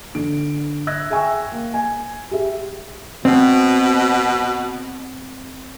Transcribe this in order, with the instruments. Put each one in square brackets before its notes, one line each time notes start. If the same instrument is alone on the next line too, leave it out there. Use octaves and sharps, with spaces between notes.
[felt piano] D3 D7
E5 E6 F#6 G#6 A#6
G#4 E5 G5 G#5 C#6 E6
A#3
G#5
G4 G#4 E5
[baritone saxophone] B2 [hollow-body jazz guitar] C4